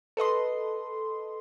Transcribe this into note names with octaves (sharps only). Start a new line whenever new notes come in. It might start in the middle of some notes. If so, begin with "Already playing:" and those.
A4 B4 D#5 C6